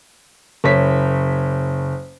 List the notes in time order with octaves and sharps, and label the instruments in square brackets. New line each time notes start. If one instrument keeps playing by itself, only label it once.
[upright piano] F#1 C#5 B6